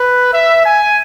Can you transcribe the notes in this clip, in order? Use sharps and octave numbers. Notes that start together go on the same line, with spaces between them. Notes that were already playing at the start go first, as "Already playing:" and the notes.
Already playing: B4
E5
G#5